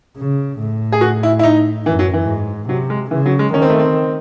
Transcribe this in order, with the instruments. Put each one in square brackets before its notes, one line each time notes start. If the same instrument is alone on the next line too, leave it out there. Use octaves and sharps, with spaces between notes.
[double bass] C#3
A2
[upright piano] G#4
F#4
E4
E4
D#4
[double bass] F#2 [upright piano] E3
[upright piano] F#3
E3
[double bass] G#2
[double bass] C3 [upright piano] F#3
[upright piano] G#3
[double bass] C#3 [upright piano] E3
[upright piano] F#3
G#3
[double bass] D#3 [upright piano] C#4
[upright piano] C4
A3
C4